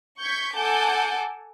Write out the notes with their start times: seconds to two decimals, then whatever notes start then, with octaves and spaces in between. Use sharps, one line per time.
0.18 C#6 G6 G#6 B6
0.55 A4 F#5 G#5 A5 D6 G6